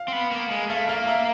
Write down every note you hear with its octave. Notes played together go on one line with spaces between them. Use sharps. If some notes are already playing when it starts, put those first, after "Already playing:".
Already playing: F5
C4
B3
A#3
G#3
A3 F5
A#3 F5
E5